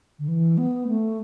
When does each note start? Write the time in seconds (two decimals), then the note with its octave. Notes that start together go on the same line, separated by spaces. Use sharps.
0.19 D3
0.28 E3
0.57 B3
0.87 A3